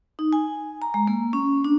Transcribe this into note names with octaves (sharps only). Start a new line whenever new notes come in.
D#4
G#5
A#5
G#3
A#3
C#4
D4